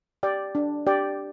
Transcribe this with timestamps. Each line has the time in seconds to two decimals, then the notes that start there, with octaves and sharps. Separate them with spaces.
0.23 G4 D5 G5
0.55 D4
0.87 G4 D5 G5